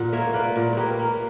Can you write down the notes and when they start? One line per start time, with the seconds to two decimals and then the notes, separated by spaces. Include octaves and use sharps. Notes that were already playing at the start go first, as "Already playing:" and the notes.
Already playing: A#2 F#5
0.12 A#3 C#5 E5
0.33 A#3 B4 D5
0.56 A#2
0.73 A#3 G4 B4 C#5
0.99 A#3